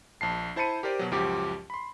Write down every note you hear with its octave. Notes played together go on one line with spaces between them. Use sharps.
A#1 A5 C7
E4 C5 A5 B5 C#7 D#7
G4 A#4 C5 D5
B2 F#3
C#2 F#2 F3 F#4 G4 D6
B5 C6